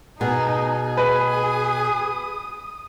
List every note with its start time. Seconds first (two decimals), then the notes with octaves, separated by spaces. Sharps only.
0.21 B2 D#4 G#4
0.97 B4 D#6